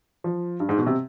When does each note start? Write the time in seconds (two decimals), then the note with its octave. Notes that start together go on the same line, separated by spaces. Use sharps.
0.24 F3
0.60 G2
0.69 G#2
0.78 B2
0.86 C3